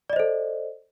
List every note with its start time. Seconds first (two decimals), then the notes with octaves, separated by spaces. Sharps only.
0.10 D5
0.13 D#5
0.16 C5
0.20 A4